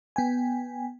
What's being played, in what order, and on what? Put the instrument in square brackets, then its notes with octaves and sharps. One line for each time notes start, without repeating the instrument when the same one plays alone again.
[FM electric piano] B3 G5 G#5